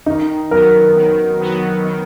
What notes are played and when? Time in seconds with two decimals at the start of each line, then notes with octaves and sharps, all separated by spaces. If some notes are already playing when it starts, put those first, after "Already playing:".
0.06 D#3 D#4
0.51 F#3 B3 A#4
0.96 D#3
1.41 F#3 B3
1.85 D#3